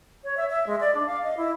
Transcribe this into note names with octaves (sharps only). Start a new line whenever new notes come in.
C#5
E5
E5
G#3
D5
D4
F5
D#5
E4